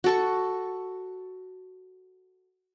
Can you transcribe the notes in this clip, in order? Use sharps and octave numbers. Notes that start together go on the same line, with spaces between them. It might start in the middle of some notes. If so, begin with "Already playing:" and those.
F#4 A4 C#6